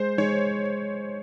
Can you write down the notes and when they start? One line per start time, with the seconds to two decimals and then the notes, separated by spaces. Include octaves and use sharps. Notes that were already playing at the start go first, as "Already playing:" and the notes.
Already playing: G#3 C5
0.18 G#3 C#5